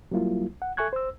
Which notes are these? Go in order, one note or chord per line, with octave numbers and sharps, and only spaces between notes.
F#3 G3 A#3 E4 F4
F#5
A4 E5 G#5 C#6 F#6 G#6
C5 E6